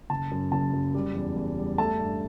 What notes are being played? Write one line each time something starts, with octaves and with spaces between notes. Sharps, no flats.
F#1 A5
F#2
F#1 A5
F#2
G3
E2
E2
G3
A3 A5
G2